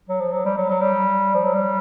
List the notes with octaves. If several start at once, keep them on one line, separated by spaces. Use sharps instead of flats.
F#3
F3
F#3
G3
F#3
F#3
G3
F3
F#3
G3